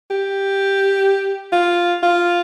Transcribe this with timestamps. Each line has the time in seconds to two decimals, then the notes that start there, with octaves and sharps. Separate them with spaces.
0.10 G4
1.52 F4
2.03 F4